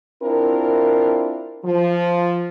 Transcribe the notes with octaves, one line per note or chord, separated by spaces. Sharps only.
C4 D4 E4 F4 A#4
F3